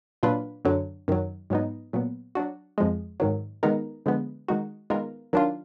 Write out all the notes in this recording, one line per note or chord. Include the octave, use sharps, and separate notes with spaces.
A#2 F#3 D4 F4 B4
F#2 D3 F#3
F#2 D#3 F#3
G#2 F#3 B3 D#4
A#2 F#3 B3
F#3 D4 F#4
F2 F3 G#3
G#2 D#3 F#3
D#3 G#3 B3 D#4 A#4
D3 F3 G#3 B3
D#3 G#3 D#4 F#4
D#3 G#3 B3 F4 A#4
D#3 F#3 D4 F4